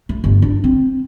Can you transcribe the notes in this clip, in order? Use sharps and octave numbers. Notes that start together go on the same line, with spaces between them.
A3
G1
D4
C4